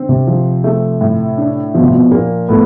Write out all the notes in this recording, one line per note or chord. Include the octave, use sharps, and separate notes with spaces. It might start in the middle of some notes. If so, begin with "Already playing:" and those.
Already playing: D3 C4
C3
F3
A3
A2
D4
B2 F3
C3
B2
A#2 A#3
A2 B3